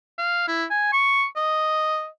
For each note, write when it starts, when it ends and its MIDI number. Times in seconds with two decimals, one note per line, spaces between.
0.18 0.48 77
0.48 0.64 64
0.70 0.89 80
0.93 1.25 85
1.36 2.07 75